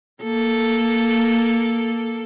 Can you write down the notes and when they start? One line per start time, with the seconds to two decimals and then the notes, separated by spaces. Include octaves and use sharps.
0.23 A#3 A4